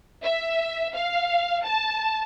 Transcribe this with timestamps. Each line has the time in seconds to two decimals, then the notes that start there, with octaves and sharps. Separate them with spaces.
0.23 E5
0.93 F5
1.65 A5